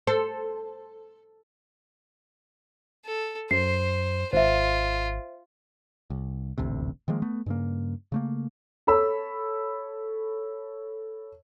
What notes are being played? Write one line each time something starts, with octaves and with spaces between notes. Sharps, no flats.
A4 C5
A4
F#2 C5 C7
G#1 F4 C5 E5
C2
D#1 A1 D2 C3
D#3 F3 G#3 A#3
A3 B3
G2 C#3 A#3
C#3 A3 A#3
A4 C#5 B5 E6